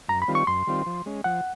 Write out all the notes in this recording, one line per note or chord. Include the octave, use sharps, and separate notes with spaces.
F#2 A#5
B5
D#3 G3 C4 F4
C#6
F#2 C6
D#3 G3 C4 F4
F3
G#3 C#4
F3 F#5